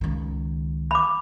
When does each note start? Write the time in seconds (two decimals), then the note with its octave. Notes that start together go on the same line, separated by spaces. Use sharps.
0.01 C#2 D#3
0.91 B5 D6